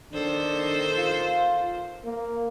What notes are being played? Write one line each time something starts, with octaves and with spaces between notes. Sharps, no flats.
D#3 D4 A4 C5
F4
A#3